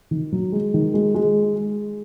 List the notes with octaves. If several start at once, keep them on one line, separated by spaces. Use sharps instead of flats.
D#3
F#3
G#3
D#3
G#3
G#3